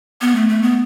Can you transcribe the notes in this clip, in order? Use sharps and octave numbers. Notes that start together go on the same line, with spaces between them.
B3
A3
A3
B3